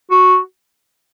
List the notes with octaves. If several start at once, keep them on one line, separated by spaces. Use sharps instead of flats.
F#4